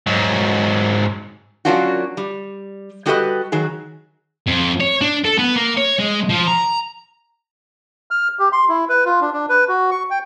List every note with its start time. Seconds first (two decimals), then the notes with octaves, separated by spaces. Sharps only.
0.07 G#2 F#3
1.65 F#3 A#3 C#4 D4 F4 F#4
2.17 G3
3.06 G3 F#4 G4 A4 B4 D#5
3.52 D#3 F#3 G#4
4.47 F2
4.80 C#5
5.02 D4
5.25 A4
5.39 B3
5.56 A#3
5.77 C#5
5.99 G#3
6.29 F3
6.47 A#5
8.11 F6
8.39 G4
8.52 C6
8.69 E4
8.89 B4
9.06 F4
9.21 D4
9.33 D4
9.49 B4
9.69 F#4
9.91 C#6
10.11 G5